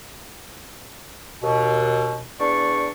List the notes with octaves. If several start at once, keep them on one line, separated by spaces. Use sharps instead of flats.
D#2 B2
E2 D4 D5 C#6